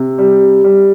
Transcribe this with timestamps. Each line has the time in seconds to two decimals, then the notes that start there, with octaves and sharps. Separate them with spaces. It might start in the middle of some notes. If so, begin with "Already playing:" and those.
Already playing: C3
0.18 G3
0.64 G3